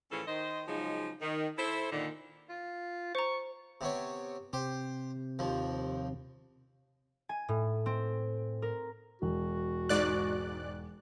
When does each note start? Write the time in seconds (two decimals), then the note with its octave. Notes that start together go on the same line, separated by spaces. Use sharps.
0.11 A2 E3 F3 C#4 G#4 A4
0.28 D#3 C5 D#5
0.68 C#3 F3 F#3 G#3 D#4
1.21 D#3
1.58 E4 A4 C5
1.92 A#2 D3 D#3
2.49 F4
3.15 C5 A#5 C#6
3.81 C3 B3 C#5
4.53 C3 G4 C5
5.39 D#2 F3
7.29 G#5
7.48 A2
7.86 C4
8.62 A#4
9.22 E1 F#4
9.89 G#2 D5 F#6